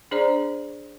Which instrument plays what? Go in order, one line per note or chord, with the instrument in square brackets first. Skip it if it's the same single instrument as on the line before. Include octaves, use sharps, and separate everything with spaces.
[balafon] D4 G#4 C5 D5 A#5